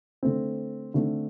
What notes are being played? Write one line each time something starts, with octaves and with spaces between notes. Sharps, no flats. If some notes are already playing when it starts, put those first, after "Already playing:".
D3 A3 C4
D3 A3 C4